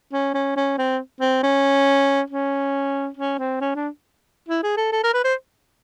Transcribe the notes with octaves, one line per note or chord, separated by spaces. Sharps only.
C#4
C#4
C#4
C4
C4
C#4
C#4
C#4
C4
C#4
D4
E4
G#4
A4
A4
A#4
B4
C5